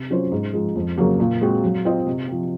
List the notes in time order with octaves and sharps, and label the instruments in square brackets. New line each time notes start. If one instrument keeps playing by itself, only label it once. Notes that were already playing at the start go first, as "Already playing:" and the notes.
Already playing: [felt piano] C3
F#3 C#4 F4 C5
G#2
F3 G#3
F2
C#3 F#3 A#3
A#2
G#3 C4 F#4
F#3
C4 F4 C5 D#5
C3
F3 C4